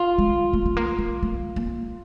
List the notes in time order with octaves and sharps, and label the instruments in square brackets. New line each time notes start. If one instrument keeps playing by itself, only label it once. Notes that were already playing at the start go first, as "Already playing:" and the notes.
Already playing: [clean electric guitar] F4
[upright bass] G#3
A3
A3
A#3
A3
A3
A#3